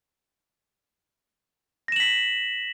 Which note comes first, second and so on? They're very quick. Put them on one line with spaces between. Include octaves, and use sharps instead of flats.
A#6 E7 F#7 B6